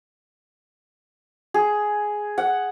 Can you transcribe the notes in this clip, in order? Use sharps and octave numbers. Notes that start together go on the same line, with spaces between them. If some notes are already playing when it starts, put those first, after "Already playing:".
G#4
F#5